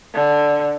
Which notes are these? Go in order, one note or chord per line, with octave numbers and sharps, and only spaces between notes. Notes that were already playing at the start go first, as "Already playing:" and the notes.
D3